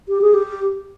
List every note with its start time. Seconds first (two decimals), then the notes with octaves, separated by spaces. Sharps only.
0.09 G4
0.21 G#4
0.34 G4